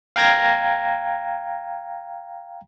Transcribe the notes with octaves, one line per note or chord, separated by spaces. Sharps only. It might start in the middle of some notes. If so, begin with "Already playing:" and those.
F5 G5 A#5 G#6 A#6